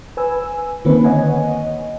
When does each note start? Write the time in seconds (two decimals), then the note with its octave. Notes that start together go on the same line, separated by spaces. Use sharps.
0.17 B4 G#5 E6
0.85 D3 D#3 A#3 C4 C#4 B4
1.04 C#5 D#5 F#5 G#5